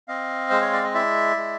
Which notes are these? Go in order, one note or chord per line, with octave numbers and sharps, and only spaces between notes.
C4 D#5 F5
G#3 C5
C#5
D5
D#5
E4 D5 E5
G#3